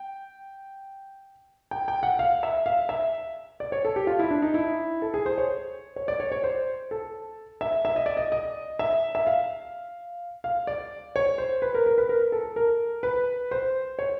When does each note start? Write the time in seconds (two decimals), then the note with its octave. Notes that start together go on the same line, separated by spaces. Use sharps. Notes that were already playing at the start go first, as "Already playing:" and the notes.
Already playing: G5
1.71 G5
1.88 G5
2.03 F#5
2.19 F5
2.43 E5
2.66 F5
2.89 E5
3.60 D5
3.72 C#5
3.85 A4
3.96 G4
4.07 F4
4.19 E4
4.31 D4
4.42 D#4
4.54 E4
5.02 A4
5.14 G#4
5.26 C5
5.38 C#5
5.96 C#5
6.08 D5
6.20 C#5
6.32 C#5
6.44 C5
6.91 A4
7.61 E5
7.85 E5
7.96 D#5
8.06 D5
8.17 D#5
8.32 D#5
8.79 E5
9.15 E5
9.27 F5
10.44 F5
10.67 D5
11.16 C#5
11.38 C5
11.62 B4
11.74 A#4
11.86 A#4
11.98 B4
12.09 A#4
12.32 A4
12.56 A#4
13.03 B4
13.51 C5
13.99 C#5